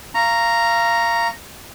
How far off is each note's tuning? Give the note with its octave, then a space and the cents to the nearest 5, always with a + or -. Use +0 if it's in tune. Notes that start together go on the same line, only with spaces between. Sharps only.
F5 -25 A#5 +0 C#6 +0